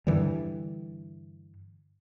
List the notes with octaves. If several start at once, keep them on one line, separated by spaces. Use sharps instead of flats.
G2 D3 E3 G3